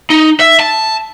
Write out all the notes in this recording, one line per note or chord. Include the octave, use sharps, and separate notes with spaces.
D#4
E5
A5